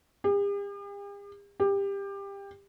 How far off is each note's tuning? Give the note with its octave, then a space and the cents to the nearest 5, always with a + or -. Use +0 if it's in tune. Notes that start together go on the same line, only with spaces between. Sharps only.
G4 +45
G4 +20